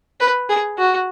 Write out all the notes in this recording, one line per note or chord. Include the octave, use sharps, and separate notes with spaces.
B4
G#4
F#4